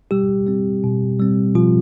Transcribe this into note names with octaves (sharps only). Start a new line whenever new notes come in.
B2 G3 G4
G3 C4
B2
G3 C4
B2 F3 F4